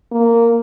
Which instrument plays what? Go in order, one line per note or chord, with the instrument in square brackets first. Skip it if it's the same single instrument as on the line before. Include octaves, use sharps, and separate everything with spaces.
[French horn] A#3